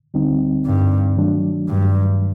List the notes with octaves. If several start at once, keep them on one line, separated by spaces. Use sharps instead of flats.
D2 D3 G3 C4 D#4
G2
D#3 F#3 A3 D4
G2